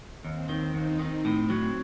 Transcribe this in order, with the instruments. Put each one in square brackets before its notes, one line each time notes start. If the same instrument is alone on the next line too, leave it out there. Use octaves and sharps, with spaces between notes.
[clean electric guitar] D#2 [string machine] C4
[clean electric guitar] D#3
[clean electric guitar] D#2 [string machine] D#4
[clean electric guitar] D#3
[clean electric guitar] A2 [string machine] C4
[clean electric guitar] F#3